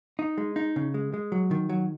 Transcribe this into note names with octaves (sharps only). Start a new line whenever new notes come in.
D#4
G#3
D#4
C#3
G#3
G#3
F#3
D#3
F#3